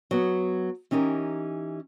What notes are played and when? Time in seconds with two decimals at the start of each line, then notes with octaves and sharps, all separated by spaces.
0.11 F#3 B3
0.91 E3 C#4 D#4 G4 A#4